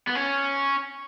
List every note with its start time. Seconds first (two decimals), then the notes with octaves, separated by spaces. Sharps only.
0.07 B3
0.15 C#4